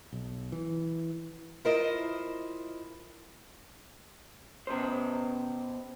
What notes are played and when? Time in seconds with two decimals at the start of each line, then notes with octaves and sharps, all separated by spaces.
0.13 B1
0.52 E3
1.65 E4 F4 A#4 C5 D5 D#5
4.67 B2 C5